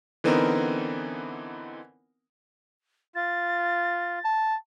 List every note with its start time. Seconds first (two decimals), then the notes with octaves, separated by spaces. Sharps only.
0.24 D3 E3 B3 C4 D#4 A#4
3.15 F4 A6
4.24 A5